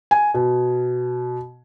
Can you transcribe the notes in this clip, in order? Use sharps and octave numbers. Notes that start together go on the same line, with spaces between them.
G#5
B2